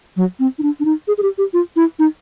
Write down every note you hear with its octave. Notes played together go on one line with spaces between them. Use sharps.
F#3
C4
D#4
D4
D4
D#4
G#4
G#4
G4
G4
F4
E4
D#4